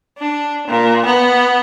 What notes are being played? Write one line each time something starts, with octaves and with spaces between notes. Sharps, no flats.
D4
A#2
B3